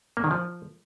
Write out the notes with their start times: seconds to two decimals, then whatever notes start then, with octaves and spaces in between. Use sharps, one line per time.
0.17 A#3
0.24 D#3
0.31 F3